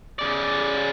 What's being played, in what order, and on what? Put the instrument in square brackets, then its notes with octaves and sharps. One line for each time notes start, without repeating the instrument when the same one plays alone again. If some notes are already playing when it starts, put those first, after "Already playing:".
[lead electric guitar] C#3 D5